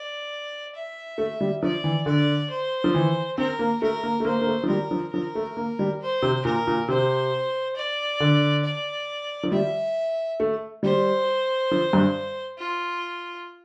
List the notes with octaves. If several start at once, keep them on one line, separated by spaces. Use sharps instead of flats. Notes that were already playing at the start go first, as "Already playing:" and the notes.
Already playing: D5
E5
A3
G3
F3 D5
E3
D3 D5
C5
F3
E3
C4 A#4
A#3
A3 A#4
A#3
A3
A#3 C5
A#3
A3
F3
G3 A#4
F3
F3 A#4
A3
A#3
G3
C5
C3
A#2 A#4
A#2
C3 C5
D5
D3
D5
F3
G3 E5
A3
G3 C5
F3
G2
F4